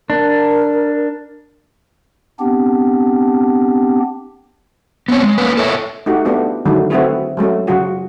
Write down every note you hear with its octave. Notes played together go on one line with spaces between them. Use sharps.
D4 A#4
B3 C4 D4 G4
B3 C4 C#5
G#3
A#3 C#4 B4
A4 A#4 C#5 D#5 E5
A3 D#4 F#4 G4
A3 B3 D4 F4 G4
D3 D#3 F#3 G#3 A3
A3 C4 E4 F#4 G#4 B4
F#3 G#3 A3 C#4
C#3 F#3 F4 F#4 G#4